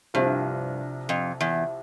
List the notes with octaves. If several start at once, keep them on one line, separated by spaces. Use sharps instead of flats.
C2 G2 C3 F3
F2
E2